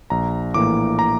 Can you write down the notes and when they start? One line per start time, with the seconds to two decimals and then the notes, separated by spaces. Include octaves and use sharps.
0.10 A#1 A#5
0.54 A2 E3 A#3 D6
0.99 A#5